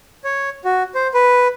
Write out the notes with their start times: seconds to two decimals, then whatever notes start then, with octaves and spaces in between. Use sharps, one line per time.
0.24 C#5
0.65 F#4
0.95 C5
1.14 B4